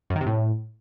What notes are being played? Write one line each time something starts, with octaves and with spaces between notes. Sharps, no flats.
F#2
D#3
C3
A2